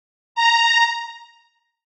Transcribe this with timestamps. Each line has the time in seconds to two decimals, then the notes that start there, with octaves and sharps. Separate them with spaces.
0.35 A#5
0.67 A#5